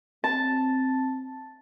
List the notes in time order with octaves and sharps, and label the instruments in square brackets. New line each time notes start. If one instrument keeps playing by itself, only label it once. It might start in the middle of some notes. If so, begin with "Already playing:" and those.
[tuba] C4 [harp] A5